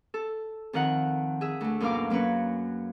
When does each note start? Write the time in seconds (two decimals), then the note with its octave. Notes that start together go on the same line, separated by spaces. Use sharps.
0.14 A4
0.73 F2 D#3 A#4 F#5
1.41 G#4 E5
1.61 D2 A3
1.80 F#2 B2 A#3 A#4 F5 D6
2.10 F#3 A#3 C#4 B4 C#5